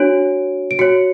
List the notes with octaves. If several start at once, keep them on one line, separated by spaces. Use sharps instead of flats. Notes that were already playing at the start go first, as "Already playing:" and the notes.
Already playing: D4 F#4 C#5 D7
D7
F#4 C#5 C#7